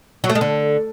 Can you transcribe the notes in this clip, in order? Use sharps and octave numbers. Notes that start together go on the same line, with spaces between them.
F#3
A3
G#3
D3